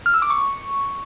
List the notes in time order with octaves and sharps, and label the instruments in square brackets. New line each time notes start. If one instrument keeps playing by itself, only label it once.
[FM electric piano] F6
E6
D6
C#6